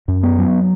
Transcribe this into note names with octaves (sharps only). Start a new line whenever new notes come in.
F#2
B3
F#3